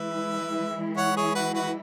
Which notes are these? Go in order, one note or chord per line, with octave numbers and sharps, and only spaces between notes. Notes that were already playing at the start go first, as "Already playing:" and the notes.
Already playing: E3 G#3 E4 B4 E5
C#5 F#5
G#4 C#5
F#4 B4
F#4 B4